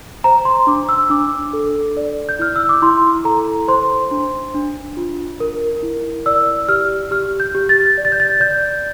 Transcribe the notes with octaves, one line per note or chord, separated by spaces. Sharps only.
C5 A#5
C6
D4 D6
E6
D4 D6
A4
D5
G6
E4 F6
E6
D6
E4 C6
A4 A#5
C5 C6
D4
D4
F4
A#4
E4
D5 E6
G4 F6
G4 F6
G6
G4
A6
D5
A6
G6
A6
D5 G6